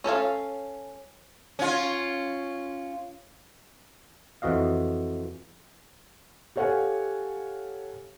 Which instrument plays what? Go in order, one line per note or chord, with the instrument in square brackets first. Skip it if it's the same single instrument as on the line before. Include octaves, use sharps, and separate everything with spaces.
[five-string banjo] C#4 A4 C#5 F5
[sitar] C#4 F4
[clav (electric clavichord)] F2 E3 F#4 D#5 F5
[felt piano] G4 A4 C#5 F5 F#5 G#5